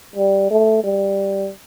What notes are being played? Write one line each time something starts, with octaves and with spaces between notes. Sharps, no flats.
G3
A3
G3